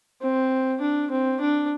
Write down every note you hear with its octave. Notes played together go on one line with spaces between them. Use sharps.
C4
D4
C4
D4